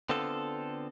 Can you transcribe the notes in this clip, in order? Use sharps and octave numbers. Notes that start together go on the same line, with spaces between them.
D3 B3 C4 F4 A4